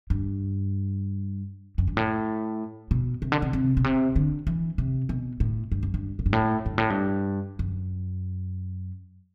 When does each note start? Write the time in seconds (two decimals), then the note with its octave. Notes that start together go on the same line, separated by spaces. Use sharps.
0.10 G2
1.78 F#2
1.87 G2
1.97 A2
2.91 B2
3.22 C3
3.32 D3
3.42 C3
3.53 C3
3.77 B2
3.84 C3
4.16 D3
4.47 E3
4.78 C3
5.09 B2
5.40 A2
5.72 G2
5.83 F#2
5.94 G2
6.19 A2
6.26 G2
6.33 A2
6.66 G2
6.78 A2
6.90 G2
7.59 F#2